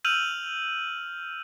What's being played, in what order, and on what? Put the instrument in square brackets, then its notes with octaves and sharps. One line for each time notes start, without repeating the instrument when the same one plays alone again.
[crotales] E6 F6 G6 D#7 F7 F#7